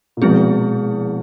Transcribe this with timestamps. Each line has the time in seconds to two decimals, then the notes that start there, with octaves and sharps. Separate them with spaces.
0.17 A#2
0.22 B2 F3 G#3 C4 E4 G#4